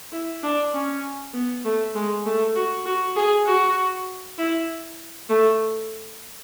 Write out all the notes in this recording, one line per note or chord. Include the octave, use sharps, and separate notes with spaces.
E4
D4
C#4
B3
A3
G#3
A3
F#4
F#4
G#4
F#4
E4
A3